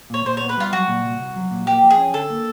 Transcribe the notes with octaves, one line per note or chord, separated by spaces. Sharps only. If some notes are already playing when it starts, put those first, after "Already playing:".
A#2 C#5
A#2 C5
B3 C#5
B4
G3 F4
F#3 F#4
A#2
C2
C2
F#3
A#2
A#3 G4
F3
G#4
C#4
D3 A4
A#3